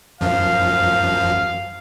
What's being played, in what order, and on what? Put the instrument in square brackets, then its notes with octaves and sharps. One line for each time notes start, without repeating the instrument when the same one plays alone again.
[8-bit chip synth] F#2 F3 [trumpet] F5